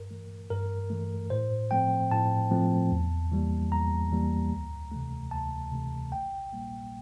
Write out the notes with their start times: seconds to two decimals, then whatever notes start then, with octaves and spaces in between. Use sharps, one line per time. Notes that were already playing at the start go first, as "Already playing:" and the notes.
Already playing: G2 A#4
0.11 E3 A3
0.50 G2 A#4
0.90 E3 A3
1.30 A2 C5
1.71 F3 A3 C4 G5
2.11 A2 A5
2.51 F3 A3 C4
2.91 E2
3.32 E3 G3 A#3
3.71 E2 A#5
4.12 E3 G3 A#3
4.52 D2
4.92 C3 E3 A3
5.31 D2 A5
5.72 C3 E3 A3
6.12 A#1 G5
6.52 A#2 G3 A#3